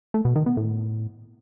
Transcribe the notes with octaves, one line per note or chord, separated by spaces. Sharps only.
A3
B2
D#3
B3
A2